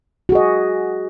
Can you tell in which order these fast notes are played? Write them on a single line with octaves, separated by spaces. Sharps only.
F#4 G#4 D#5